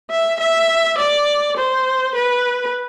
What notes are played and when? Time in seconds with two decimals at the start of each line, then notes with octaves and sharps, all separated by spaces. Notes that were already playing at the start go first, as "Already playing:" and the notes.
0.11 E5
0.40 E5
0.98 D5
1.57 C5
2.15 B4